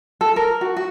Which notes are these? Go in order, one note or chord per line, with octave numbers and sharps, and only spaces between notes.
A4
A#4
F#4
F#4